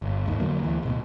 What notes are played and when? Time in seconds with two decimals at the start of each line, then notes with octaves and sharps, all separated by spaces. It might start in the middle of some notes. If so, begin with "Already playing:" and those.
0.02 G1
0.27 D#2 G#2 D#3
0.40 F2 D3 F#3 A#3
0.63 D2 E3
0.83 D1 B2